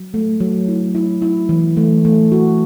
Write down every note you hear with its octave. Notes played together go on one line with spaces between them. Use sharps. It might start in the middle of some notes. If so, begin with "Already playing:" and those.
Already playing: F#3
A3
F#3
E4
E4
E4
E3
A3
A3
F#4